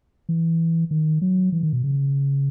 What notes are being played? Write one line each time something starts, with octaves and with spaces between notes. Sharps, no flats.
E3
D#3
F#3
E3
D#3
B2
C#3